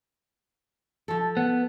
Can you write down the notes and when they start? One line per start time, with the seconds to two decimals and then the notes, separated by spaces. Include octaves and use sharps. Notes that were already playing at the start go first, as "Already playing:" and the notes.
1.08 F3 A4
1.37 B3